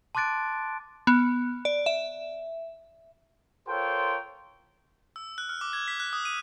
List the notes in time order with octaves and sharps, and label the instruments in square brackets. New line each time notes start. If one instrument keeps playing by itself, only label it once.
[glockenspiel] A5 C6 D6 F#6 A6 D7
[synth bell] B3
D5
E5
[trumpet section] F4 A4 A#4 C5 C#5 G5
[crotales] E6
F#6
F6
D6
G#6
B6
F#6
D#6
D#7